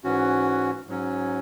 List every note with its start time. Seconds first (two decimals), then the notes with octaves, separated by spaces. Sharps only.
0.04 G#2 E3 C#4 F#4
0.88 G#2 F#3 C#4